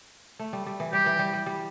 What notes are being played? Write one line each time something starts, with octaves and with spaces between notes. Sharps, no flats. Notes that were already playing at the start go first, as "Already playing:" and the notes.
A3
G3
G3
E3
G3 G4
E3
G3
G3
G3